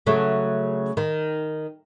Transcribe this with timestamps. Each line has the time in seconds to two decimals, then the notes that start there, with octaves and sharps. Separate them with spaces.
0.06 C#3 F#3 A3
0.97 D#3